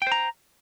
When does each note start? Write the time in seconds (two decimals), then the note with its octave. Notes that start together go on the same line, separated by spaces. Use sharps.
0.02 G5
0.07 C5
0.12 A#5